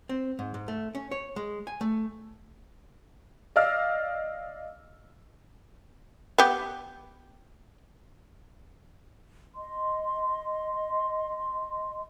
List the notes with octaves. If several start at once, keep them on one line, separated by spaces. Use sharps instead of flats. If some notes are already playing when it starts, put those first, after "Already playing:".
C4
G#2
G#2
A3
C#4
C#5
G#3
G#5
A3
D5 D#5 F5 E6 F6
B3 G4
D#5 C6